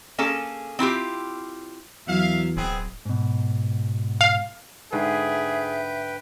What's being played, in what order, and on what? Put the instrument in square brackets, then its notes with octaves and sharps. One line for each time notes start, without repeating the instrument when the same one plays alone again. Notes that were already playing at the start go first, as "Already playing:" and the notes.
[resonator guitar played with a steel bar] A#3 C#4 G#4 A4
C4 E4 F4 G4
[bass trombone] E2 [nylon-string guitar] F#3 [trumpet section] E5 F5
[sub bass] D1 [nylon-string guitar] B2 B4 G5 [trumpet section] B3 C4 G#4
[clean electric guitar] G#2 B2
[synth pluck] F5
[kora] G#2 D3 C#5 [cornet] G#4 [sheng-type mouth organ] B4 G5 [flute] E5